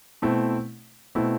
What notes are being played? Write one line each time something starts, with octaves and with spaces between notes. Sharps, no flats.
B2 A3 C4 E4
B2 A3 C4 E4